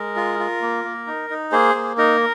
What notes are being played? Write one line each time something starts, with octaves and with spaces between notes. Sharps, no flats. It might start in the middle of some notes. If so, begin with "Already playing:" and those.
Already playing: G#3 A#4
F4
F4
A#3
A#3
D#4
D#4
A#3 G#4 C5
A#3
D#4 A#4